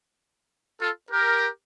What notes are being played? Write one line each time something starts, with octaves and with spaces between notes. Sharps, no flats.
F4 A4
G4 A#4